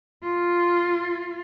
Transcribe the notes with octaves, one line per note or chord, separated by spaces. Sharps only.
F4